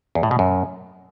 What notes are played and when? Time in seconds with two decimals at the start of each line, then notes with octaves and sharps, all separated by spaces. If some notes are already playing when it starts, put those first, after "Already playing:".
0.15 E2
0.23 A2
0.31 B2
0.39 F#2